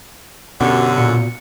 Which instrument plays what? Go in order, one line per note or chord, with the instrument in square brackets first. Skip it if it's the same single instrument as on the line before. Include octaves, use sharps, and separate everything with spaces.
[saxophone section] F#2 D3 [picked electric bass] B2 [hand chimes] G4 F#5
[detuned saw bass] A#2 [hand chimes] C#7